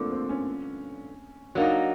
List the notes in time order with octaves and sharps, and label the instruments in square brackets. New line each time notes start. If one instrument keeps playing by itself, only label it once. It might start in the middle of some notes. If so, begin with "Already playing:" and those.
Already playing: [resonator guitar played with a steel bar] G2 D3 F3 [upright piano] A3 A#3 C4 D4
[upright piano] C4
C#4
[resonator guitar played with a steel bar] F#3 A#3 D#4 [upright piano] D4